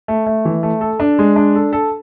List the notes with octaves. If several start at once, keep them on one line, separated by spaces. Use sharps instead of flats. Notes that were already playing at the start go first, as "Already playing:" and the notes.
A3
A3
E3
A3
A4
D4
G#3
D4
A4
A4